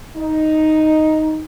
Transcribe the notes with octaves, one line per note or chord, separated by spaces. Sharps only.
D#4